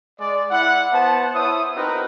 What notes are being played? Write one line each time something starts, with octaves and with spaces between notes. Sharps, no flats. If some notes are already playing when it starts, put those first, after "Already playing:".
G#3 D5
E4 F#5
B3 C5 A5
E4 C5 C#5 D#6
C4 D#4 F#4 A#4 B4